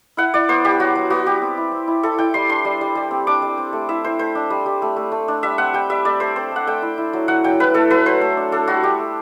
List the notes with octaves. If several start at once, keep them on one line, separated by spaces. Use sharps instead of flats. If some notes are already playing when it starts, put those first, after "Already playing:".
E4 F#5
E4 D5
B3 C5
G3 G4
F#3 F#4
F#3
B3 F#4
G3 G4
C4
E4
C4
E4
E4 A4
E4 G5
G3 C6
D4 C6
G3
G3
G3
C4
D4 D6
G3
C4
A3
E4 E5
E4 C5
A3 C5
D4
G3
G3
A3
A3
A3
D4
G3 E5
C4 F#5
G3 G5
G3 E5
A3 D5
A3 C5
C4 C5
A3
F#5
A3 G5
E4
E4
F#3
F#3 F#5
F#3 G5
E4 B4
A3 A4
F#3 B4
F#3 C5
A3
D4
D4 A4
G3 F#4
D4 G4
A3